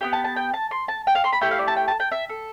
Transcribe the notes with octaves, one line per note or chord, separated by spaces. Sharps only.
B3 E4 G4 G5
A5
A5
G5
A5
C6
A5
G5
F5
C6
B5
A3 E4 G4 G5
F5
D5
A5
G5
A5
G5
E5
A4